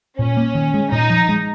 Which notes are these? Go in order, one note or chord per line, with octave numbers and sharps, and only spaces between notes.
A#2 C#4
A#3
D#3
G#3
A#2 D#4
F3
G#3